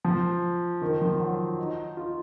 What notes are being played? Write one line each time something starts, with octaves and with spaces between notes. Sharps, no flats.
F3
D#3
F3
F#3
D#4
F4